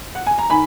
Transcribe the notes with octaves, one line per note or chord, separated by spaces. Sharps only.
F#5
G#5
A#5
D#3 G#5 B5